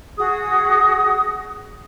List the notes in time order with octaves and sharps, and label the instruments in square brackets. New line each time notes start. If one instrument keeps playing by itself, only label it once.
[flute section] F#4 G#4 D#6